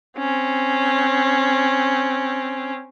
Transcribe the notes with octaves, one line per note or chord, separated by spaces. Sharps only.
C4 C#4